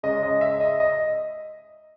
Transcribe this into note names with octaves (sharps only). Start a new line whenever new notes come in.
C#3 G#3 C#4 D#5
D#5
E5
D#5
D#5